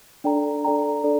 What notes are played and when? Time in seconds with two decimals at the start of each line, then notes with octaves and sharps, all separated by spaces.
0.24 D4 A4 D5 G5 A#5
0.64 D4 A4 D5 G5 A#5
1.04 D4 A4 D5